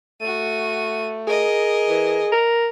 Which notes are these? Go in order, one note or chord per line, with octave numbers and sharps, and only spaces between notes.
A3 F#4 D#7
G#4 A#4 D#5
E3
A#4